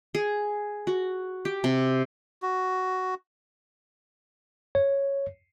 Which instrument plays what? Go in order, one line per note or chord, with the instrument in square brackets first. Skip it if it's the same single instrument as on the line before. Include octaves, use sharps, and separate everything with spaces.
[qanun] G#4
F#4
G4
C3
[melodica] F#4
[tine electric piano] C#5